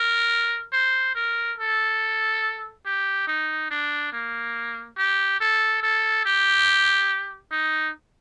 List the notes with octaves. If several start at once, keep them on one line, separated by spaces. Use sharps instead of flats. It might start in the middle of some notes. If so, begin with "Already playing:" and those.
Already playing: A#4
C5
A#4
A4
G4
D#4
D4
A#3
G4
A4
A4
G4
D#4